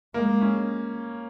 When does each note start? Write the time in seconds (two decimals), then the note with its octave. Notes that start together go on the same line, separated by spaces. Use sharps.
0.14 G#3 A#3
0.41 C#4